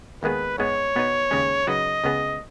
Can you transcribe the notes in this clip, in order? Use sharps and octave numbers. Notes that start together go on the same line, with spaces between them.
D#2 D#3 G#3 B3 G#4 B4
G#2 G#3 B3 C#5
B2 B3 D#4 B4
D#2 C#3 G#3 C#4
C#3 F#3 D#4 F#4 B4 D#5
C#2 C#3 B3 G#4